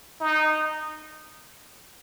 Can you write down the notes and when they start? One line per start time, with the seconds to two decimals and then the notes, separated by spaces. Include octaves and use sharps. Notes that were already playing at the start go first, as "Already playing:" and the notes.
0.20 D#4